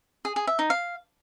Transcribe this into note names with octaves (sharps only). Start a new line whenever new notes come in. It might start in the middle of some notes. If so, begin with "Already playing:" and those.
G#4
G#4
E5
D#4
F5